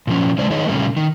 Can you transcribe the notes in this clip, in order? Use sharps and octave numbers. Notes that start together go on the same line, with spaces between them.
A#2 F3 C#4
A2 C#3 G#3 C5 D5
D#3 D#4 G#4 C#5 D#5
A#2 C#3 G3 A3 A#3
D#3